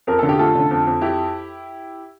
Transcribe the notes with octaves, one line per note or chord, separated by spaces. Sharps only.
F2 A#4
D3 A4
G4
A3 F4 A4
D3
F2
F2
E4 G4